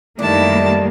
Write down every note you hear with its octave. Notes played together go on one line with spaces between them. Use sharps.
F#2 D#3 G3 A3 A#3 D4 E4 A5